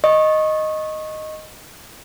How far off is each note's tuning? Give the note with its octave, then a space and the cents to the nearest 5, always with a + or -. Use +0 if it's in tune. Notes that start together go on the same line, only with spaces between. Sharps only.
D#5 +0 C#6 -20